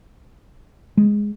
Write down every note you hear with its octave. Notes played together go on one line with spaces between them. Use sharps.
G#3